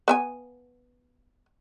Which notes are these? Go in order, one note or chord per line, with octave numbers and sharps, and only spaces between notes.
B3 E5 G#5